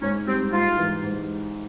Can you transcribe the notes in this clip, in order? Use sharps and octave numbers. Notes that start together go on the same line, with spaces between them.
G#2 C#4
G3 C4
G#2 F4
E3
G#2